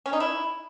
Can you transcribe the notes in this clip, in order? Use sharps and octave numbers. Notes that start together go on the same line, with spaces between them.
C#4
D#4
E4